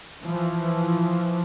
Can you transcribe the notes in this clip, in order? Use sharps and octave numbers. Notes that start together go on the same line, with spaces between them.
E3 F3